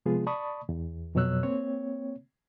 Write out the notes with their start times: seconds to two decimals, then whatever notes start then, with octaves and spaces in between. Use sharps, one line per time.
0.06 C3 F3 G#3 B3 F4 G#4
0.27 D5 A5 B5 C#6 D#6
0.69 E2
1.15 F2 B2 F#3 C#5 E6 F#6
1.43 A#3 C4 C#5